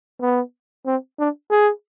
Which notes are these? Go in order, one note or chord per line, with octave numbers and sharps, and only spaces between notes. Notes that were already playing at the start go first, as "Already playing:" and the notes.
B3
C4
D4
G#4